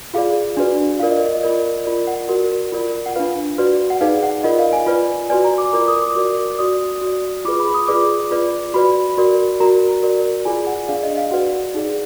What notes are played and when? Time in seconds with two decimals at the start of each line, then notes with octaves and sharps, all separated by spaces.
0.14 F4 G#4 D5 F5
0.57 D4 F#4 B4 D5
1.00 F4 A#4 D5 F5
1.11 D#5
1.33 D#5
1.43 F4 A#4 D5
1.85 F4 A#4 D5
2.07 F#5
2.29 F#4 A#4 D5
2.72 F4 A#4 D5
3.06 F#5
3.16 D4 F4 B4 F5
3.58 F#4 B4 D5
3.90 F#5
4.01 D#4 G#4 B4 D5 F5
4.23 F#5
4.43 F4 A#4 D5 D#5
4.59 F5
4.73 G#5
4.86 F4 B4 D5
5.30 F#4 B4 D5 G#5
5.44 A#5
5.58 D6
5.73 F4 A#4 D5 D6
5.88 D#6
6.02 D6
6.15 F#4 A#4 D5
6.58 F#4 D5 D#6
7.01 F#4
7.07 D5
7.45 F4 G#4 B4 D6
7.60 B5
7.74 D#6
7.88 F4 G#4 B4 D5 D6
8.31 F4 B4 D5
8.74 F#4 B4 D5 B5
9.18 F#4 A#4 D5
9.60 F#4 A#4 D5 A#5
10.03 F#4 A#4 D5
10.45 F4 G#4 D5 G#5
10.67 F#5
10.88 D4 G#4 D5 F5
11.03 D#5
11.17 F5
11.31 F#4 B4 D5 F#5
11.74 D#4 G#4 D5